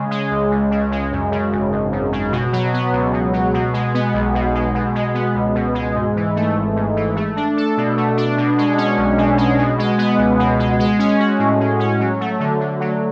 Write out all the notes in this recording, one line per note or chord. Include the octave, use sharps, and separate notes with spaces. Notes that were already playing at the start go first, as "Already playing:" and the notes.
Already playing: C#3 G#3
G#3
C#2
C#2
C#3
G#3
F#2
C#3
G#1
G#1
F#2
C#3
B2
F#3
B3
C#2
B2
F#3
B2
G#3
B3
B1
B2
G#3
B2
G#3
B3
C#2
B2
G#3
G#2
E3
A3
G#1
G#2
E3
A3
D4
A4
B2
A3
D4
B2
G#3
C#4
B1
B2
G#3
B2
G#3
B3
C#2
B2
G#3
G#3
C#4
F#4
A2
G#3
C#4
F#3
A3
D3
D3
F#3